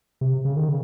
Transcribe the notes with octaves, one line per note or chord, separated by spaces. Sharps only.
C3
C#3
D#3
C#3